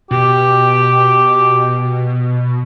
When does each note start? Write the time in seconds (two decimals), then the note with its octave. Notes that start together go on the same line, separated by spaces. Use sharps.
0.11 B2 G4